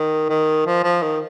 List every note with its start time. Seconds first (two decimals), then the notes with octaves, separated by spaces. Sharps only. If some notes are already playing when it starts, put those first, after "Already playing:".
Already playing: D#3
0.29 D#3
0.66 F3
0.83 F3
1.02 D#3